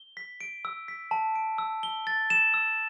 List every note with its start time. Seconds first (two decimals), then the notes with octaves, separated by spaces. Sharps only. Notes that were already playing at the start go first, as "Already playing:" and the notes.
Already playing: G7
0.17 B6
0.41 D7
0.65 E6
0.88 B6
1.11 A5
1.36 D7
1.58 E6
1.83 G7
2.07 A6
2.30 E7
2.54 E6